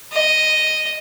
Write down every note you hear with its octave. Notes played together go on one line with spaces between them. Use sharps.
D#5